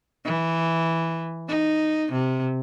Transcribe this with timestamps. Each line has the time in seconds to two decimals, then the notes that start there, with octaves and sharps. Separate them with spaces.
0.25 E3
1.48 D#4
2.12 C3